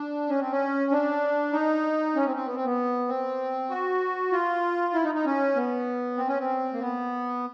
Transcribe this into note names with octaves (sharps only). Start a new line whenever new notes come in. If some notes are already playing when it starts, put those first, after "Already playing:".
Already playing: D4
C#4
C4
C#4
D4
D#4
C#4
C4
C4
B3
C4
B3
C4
F#4
F4
E4
D#4
D#4
C#4
B3
C4
C#4
C4
A#3
B3